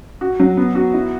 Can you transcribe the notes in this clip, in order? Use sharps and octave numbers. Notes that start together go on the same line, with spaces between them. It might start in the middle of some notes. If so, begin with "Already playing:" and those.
F#4
F#3
B3
F#4
E4